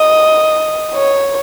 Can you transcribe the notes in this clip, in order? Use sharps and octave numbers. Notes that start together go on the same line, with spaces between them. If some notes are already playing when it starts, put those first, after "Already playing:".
Already playing: D#5
C#5